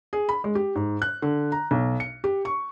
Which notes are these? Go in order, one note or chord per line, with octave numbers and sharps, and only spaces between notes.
G#4
B5
G#3
G4
G#2
F#6
D3
A#5
B1
C#7
G4
C#6